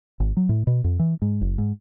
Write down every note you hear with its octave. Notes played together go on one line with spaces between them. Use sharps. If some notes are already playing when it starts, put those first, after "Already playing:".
G#1
F#3
A2
B2
F2
E3
G#2
F#1
G#2